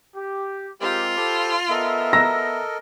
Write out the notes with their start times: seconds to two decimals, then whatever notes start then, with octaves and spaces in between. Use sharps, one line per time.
0.16 G4
0.81 G#3 C4 F4 G4 A#4
1.17 G4 A4 C5 B5 D6
1.70 B3 A4 A#4 D#5 E5
2.13 A#5 E6 A#6